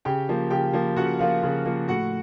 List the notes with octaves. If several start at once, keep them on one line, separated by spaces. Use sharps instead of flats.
C#3 G4 G5
F3 A#3
C#3 G4 G5
F3 A#3
C#3 F#4 F#5
F3 A#3 F4 F5
C#3
F3 A#3
A2 F#4 F#5